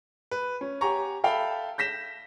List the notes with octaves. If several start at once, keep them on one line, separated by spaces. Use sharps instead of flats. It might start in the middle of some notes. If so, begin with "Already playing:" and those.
B4
C#4
G4 C#5 F#5 G#5 A#5 C#6
A4 E5 F5 G5 B5
G6 A#6 B6 E7